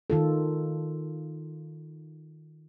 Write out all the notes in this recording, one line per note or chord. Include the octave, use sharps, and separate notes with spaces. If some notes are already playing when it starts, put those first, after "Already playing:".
D#3 F4 A4